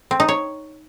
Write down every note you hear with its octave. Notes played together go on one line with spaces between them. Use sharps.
C4
D#4
C#5